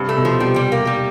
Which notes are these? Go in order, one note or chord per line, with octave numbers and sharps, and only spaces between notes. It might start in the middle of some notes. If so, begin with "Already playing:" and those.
Already playing: G2 C3
A3
B2
F3
C3 G3
G3
A#3
G3